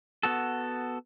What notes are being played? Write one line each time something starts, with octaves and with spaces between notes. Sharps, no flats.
B3 F#4 A4